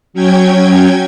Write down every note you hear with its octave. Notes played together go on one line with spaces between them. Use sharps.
F#3 C#4 G5 G#6